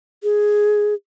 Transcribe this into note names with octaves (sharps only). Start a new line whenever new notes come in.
G#4